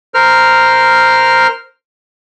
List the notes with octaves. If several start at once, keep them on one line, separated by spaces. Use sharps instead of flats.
A#4 C5 F6